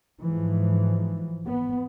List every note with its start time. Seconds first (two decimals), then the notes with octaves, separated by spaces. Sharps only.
0.20 G#2 E3 F3
1.47 B3